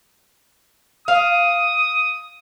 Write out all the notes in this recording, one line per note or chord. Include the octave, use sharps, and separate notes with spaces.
F5 D#6